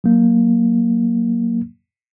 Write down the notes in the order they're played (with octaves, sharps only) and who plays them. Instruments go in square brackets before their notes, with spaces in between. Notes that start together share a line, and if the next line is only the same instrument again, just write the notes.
[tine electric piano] F#3 A#3